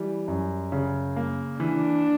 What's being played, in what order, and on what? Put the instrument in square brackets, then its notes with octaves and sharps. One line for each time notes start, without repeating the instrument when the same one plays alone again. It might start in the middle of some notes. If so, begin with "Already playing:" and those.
Already playing: [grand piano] E3 G3
F#2
C#3
A#3
[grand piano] E3 [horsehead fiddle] D4